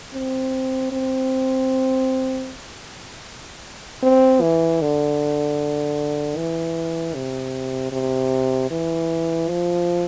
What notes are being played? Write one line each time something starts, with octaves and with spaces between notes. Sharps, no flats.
C4
C4
C4
E3
D3
E3
C3
C3
E3
F3